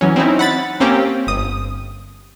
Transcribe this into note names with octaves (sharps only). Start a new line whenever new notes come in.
E3 F#3 C#4
C4 C#4 D#4 E4
F#5 B5 A6
A#3 C4 C#4 G4
G1 D#6